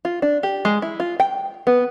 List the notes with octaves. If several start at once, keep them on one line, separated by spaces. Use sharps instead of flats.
F4
D4
G4
G#3
E4
F4
G5
B3